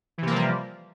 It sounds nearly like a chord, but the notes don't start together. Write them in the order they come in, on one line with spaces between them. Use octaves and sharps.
E3 C3 A#3 F3 G3